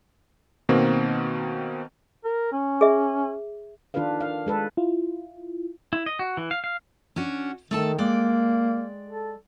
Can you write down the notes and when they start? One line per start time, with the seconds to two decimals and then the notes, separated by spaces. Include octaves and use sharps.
0.69 B2 D#3 A#3 C4
2.24 A#4
2.52 C#4
2.81 G#4 E5
3.94 D#3 D4 F4 A4 B4 F5
4.21 F5
4.47 G#3 A4 B4
4.77 E4 F4
5.93 E4
6.06 D#5
6.19 F#4
6.37 E3
6.51 F5
6.64 F5
7.16 C#4 D4 F#4
7.71 D#3 A3 A4 A5
7.98 G#3 A#3 D5 G5
9.08 A4